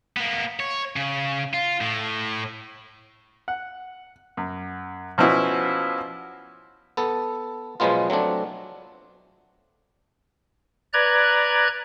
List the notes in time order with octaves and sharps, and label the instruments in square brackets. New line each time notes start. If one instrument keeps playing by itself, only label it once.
[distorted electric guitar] A#3 B3
C#5
C#3
F4
A2
[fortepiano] F#5
F#2
B2 F3 C#4 E4 F#4
[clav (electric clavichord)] B3 A4
B2 F3 F#3 G#3 B3 F4
F#3 A3 C4 D4
[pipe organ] B4 D5 A#5 F#6 G#6